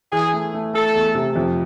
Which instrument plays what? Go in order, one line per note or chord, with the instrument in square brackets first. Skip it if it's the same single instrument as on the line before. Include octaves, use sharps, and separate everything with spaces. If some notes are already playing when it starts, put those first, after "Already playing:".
[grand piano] E3 [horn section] G#4
[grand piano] A3
A3
[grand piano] A3 [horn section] A4
[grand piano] E2
C3
F2